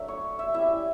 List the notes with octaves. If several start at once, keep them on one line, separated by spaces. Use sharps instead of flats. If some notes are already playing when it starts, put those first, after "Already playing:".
Already playing: F#3 A3 D4 E5
C#5
E5
G3 C#4 E4 E5